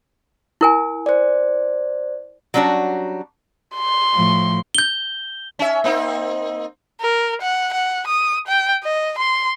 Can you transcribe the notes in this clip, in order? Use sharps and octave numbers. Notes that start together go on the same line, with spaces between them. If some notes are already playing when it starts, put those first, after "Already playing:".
E4 A#4 G#5
C5 D5
F#3 G3 C#4 D4 F#4
C6
A2 F3
G6 G7
C#4 E5
A#3 C4 D#4
A#4
F#5
F#5
D#6
G5
D#5
C6